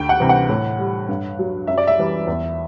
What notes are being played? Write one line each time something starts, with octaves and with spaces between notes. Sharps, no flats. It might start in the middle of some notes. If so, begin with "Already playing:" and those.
Already playing: D2 G5
F#5
C3 E3 G3
F#5
A2
G3
G2
F#3
F#2 E5
D5
E5
E3 G3
E2